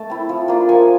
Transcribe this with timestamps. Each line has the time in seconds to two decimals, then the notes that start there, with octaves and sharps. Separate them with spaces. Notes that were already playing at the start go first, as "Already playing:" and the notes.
Already playing: A3 A5
0.10 C4 E4
0.29 F3
0.48 A#3 D4 F4
0.69 F3 G#5